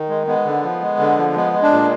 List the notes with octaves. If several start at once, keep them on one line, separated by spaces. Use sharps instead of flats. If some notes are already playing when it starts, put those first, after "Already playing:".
Already playing: D#3
G#3
G#3 B3
D3
F3
G#3
D3
F3
G#3 B3
G#3
D4
A#2